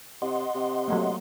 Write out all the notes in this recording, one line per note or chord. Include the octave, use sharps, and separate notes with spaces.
C3 D#5 F#5 C6
C3
F#3 A3 A#3